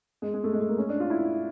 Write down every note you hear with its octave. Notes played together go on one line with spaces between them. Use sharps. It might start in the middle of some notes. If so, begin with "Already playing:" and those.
G#3
G#3
A3
G#3
A3
A#3
C#4
D4
F4
E4